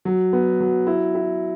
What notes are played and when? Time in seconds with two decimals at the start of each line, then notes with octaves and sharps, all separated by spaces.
0.05 F#3
0.33 B3
0.60 F#3
0.87 E4
1.15 E4